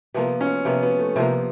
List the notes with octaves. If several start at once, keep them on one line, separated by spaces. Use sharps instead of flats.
C3 F3 A#3 B3
C#4
C3 F3 A#3 B3
B3
A3
C3 F3 A#3 B3